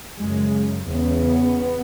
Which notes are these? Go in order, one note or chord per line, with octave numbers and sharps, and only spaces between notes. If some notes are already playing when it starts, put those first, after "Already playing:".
F#2 C#3 G#3
E2 C#3 B3